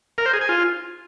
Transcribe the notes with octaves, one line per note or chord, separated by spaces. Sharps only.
A#4
C5
G#4
G#5
F4